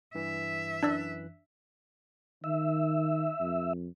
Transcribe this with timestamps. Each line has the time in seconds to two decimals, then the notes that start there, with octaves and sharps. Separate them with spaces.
0.15 G2 E3 E5
0.83 F#2 E3 D4 D5 E6 F#6
2.44 D#3 E5
3.40 F2